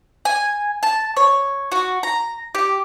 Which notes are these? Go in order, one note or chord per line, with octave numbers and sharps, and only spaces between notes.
G#5
A5
C#5
F#4
A#5
G4